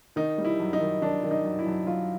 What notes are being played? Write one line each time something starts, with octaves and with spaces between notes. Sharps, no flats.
D#3 D#4
G3
E4
F#2
D#4
D#3
D#3 D4
D#3
D#4
F#2
E4
F#2
F#2 F4